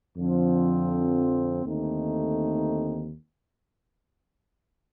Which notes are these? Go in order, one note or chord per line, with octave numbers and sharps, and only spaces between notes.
F2 D3 F3 C4
D#2 D3 A3 C4 D#4